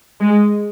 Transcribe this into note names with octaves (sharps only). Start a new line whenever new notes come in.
G#3